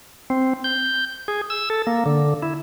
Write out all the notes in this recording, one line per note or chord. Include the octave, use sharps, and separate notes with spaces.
C4
G6
G#4
E6
A4
A#3
D3
E4